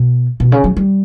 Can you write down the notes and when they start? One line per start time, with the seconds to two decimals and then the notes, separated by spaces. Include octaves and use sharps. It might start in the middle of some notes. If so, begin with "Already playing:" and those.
Already playing: B2
0.40 B2
0.52 C#3
0.64 F#3
0.77 G3